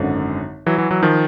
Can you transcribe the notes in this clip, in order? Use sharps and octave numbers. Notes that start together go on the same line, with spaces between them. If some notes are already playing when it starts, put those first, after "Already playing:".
Already playing: G#1 F#2 D3 F#3
E3 F#3
E3 F#3
E3 F#3
D#3 F3